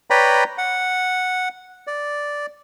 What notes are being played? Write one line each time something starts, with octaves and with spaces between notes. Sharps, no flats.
B4 C#5 D5 G5 A#5 B5
F#5
D5